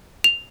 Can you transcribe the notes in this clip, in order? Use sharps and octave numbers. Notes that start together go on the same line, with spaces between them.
F7